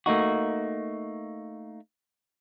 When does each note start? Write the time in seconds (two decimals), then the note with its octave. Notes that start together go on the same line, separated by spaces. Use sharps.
0.06 A3 A#3 D#4 F#4